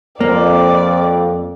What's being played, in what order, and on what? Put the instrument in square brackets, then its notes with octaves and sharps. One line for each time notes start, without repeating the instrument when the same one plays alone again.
[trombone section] F2 [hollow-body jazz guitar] A#3 [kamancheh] D5